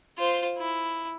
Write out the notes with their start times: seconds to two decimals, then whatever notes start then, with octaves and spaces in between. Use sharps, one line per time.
0.18 F4 C5
0.58 E4